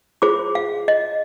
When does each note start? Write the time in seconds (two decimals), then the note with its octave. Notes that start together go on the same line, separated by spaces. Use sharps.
0.22 F4 G#4 C5 D6
0.55 F5
0.88 D#5